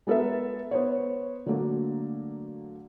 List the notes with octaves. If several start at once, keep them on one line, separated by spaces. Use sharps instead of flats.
G#3 B3 A4 A#4 E5
B3 C5 C#5
D3 F#3 A3 A#3 D4